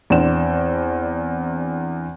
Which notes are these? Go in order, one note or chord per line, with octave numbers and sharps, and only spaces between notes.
E2 C4 D4 C5 E7